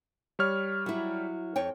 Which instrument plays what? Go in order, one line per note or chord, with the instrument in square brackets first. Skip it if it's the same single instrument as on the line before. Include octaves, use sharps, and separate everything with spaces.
[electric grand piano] G3 C#5 F6
[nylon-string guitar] F#3 E4
F2 C#5 G5